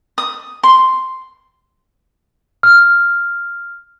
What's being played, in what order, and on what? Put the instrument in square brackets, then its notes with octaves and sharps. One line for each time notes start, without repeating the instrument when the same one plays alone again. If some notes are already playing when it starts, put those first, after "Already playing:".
[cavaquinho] D#6
C6
[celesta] F6